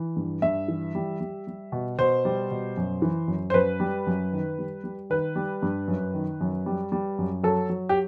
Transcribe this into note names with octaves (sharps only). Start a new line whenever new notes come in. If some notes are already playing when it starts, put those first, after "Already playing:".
Already playing: E3
G2
G2 E5
E3
G3
G3
G3
B2
B2 C5
G3
B2
F#2
E3
F#2
C5
F#2 B4
G3
F#2
D#3
G3
G3
D#3 B4
G3
G2
F#2
D#3
F#2
G3
G3
F#2
F#3 A4
F#3
G4